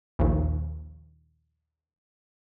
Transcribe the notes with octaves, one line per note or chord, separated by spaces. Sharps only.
A#1 D#2